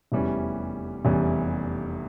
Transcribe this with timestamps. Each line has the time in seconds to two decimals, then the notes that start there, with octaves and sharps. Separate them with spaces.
0.12 F1 E2 E3 G3 C#4
1.05 F1 E2 E3 G3 C#4